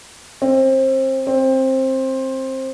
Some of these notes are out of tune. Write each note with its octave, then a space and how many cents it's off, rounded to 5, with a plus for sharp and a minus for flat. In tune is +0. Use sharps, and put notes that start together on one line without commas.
C4 +25
C4 +15